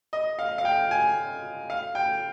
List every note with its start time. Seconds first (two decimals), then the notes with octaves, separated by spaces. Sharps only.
0.13 D#5
0.39 F5
0.58 F5
0.65 G5
0.91 G#5
1.70 F5
1.95 G5